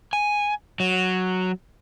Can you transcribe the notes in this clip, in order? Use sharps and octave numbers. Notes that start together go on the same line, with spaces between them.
G#5
F#3